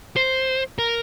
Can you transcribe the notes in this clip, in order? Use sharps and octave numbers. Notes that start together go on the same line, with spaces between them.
C5
A#4